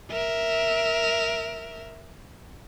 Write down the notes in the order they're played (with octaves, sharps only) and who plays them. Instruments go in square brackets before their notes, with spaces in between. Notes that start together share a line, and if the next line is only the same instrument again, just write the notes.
[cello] A#4 E5